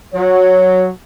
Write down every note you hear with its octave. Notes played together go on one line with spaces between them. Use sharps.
F#3 C#5